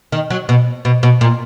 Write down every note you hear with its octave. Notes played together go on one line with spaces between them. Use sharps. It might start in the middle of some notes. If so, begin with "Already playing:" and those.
D#3
F#3
B2
B2
B2
A#2